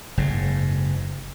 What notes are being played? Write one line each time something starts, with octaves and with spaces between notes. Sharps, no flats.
F#1 G#2